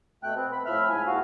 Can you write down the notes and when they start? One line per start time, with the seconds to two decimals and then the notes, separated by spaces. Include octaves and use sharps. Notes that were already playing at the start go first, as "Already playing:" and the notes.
0.23 B2 A3 G5 F#6
0.35 B3 C4
0.52 B5
0.66 A2 F3 E5 B5 F6
0.89 G#2 G#5
1.07 E2 F3 B3 F#4 F5